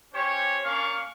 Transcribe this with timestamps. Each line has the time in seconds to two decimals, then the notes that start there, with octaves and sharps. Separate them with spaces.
0.13 C#4 G4 C5 C#5
0.64 A#3 C#4 D4 F5 C#6